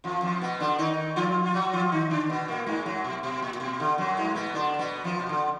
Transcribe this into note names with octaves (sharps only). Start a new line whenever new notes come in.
F2 F3
F2 F3
B2 B3
D3 D4
D#3 D#4
F3 F4
F4
F#3 F#4
F3 F4
D#3 D#4
D3 D4
B2 B3
A#2 A#3
G#2 G#3
F#2 F#3
B2
B2
A#2
A#2
B2
D3
F#2 F#3
G#2 G#3
B2 B3
D3 D4
B2 B3
F2 F3
B2
D3